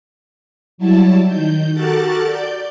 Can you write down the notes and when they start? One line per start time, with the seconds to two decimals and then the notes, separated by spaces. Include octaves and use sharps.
0.78 F#3 G3 E4 A5
1.26 D#3 G6
1.73 F#4 G4 A4 A#4 F#6 A6
2.25 D5 G6